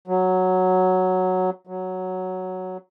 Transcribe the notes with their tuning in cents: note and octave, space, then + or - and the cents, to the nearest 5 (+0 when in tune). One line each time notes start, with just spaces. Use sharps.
F#3 +0
F#3 +0